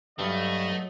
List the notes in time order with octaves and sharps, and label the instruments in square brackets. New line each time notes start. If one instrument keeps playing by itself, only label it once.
[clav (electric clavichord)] G2 [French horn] F#3 [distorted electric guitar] A3 [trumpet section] D#5